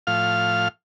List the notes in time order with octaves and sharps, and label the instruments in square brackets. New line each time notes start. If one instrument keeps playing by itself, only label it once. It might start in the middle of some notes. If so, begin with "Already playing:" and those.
[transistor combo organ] A2 F3 F5 F6